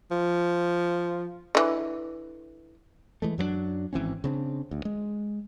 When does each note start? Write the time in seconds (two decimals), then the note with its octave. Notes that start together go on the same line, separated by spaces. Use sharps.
0.11 F3
1.55 D3 E3
3.22 E3 G#3 A3
3.38 F#2 F#3 A3 D4
3.93 G#1 E3 C4 C#4
4.24 C#3 C4 D4
4.71 D2
4.85 G#3